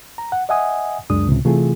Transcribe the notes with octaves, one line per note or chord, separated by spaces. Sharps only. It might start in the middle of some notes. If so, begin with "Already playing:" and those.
A#5
F#5
D#5 E5 F#5 G#5 D#6
C#2 F#2 G#3 D4 D#6
C#2 A2 C3
C3 E3 A3 F4 G#4